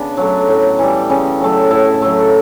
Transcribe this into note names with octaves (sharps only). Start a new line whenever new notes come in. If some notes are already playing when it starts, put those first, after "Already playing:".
Already playing: C#3 B3 D4
F#3 A3
A2
E3 G3
C#3
F#3 A3
A2 E4
F#3 A3